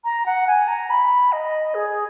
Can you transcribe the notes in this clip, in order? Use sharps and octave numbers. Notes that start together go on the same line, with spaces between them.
A#5
F#5
G#5
A#5
B5
D#5
G#4